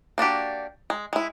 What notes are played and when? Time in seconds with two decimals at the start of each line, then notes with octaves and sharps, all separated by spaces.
0.18 A#3 D4 F#4 G4
0.90 G#3
1.13 G#3 E4